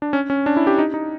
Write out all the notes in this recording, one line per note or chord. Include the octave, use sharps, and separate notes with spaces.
D4
C#4
C#4
D4
E4
G4
D#4
D#4